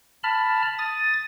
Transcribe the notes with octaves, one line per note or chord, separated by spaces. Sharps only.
A5 B5 F6
D#6 A6